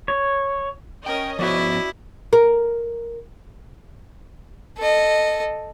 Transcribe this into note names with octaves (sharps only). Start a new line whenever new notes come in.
C#5
C#4 A#4 D#5 G5
F3 B3 E4 F#4 C5 D5
A#4
A4 D#5